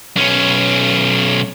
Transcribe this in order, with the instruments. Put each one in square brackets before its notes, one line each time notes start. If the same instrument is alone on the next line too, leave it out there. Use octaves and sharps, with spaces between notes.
[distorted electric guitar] B1 C#4